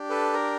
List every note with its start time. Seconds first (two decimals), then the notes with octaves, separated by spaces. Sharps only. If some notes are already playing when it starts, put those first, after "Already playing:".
Already playing: D4 G4
0.10 A4 B4
0.33 A#4